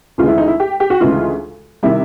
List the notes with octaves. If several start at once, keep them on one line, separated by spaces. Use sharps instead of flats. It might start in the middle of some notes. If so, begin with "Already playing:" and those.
D2 C#3 E3 G#3 F4
E4
D#4
E4
G4
G4
F#4
D2 C#3 E3 G#3 F4
C3 D#3 G3 E4